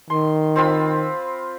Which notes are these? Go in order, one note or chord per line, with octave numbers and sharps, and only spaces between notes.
D#3 C6
C4 F4 B5